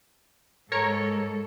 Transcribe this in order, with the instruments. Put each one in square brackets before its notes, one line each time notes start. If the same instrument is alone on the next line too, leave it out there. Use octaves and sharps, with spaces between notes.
[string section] G#2 [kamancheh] A4 [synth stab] A#4 C#5 C#7